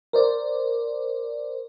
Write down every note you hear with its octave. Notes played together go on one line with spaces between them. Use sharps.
A#4 C5 D5